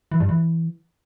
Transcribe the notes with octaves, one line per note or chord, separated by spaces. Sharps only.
E3
G2
E3